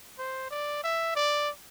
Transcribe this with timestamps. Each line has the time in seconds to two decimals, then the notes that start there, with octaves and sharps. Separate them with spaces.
0.18 C5
0.51 D5
0.83 E5
1.16 D5